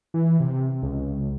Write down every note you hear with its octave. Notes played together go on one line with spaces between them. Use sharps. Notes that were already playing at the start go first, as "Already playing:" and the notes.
E3
C3
C#2